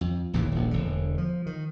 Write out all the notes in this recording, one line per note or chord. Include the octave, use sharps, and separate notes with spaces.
F2
A1 D#2 A#2 E3
D#1 A#1
E1 D3
F3
D#3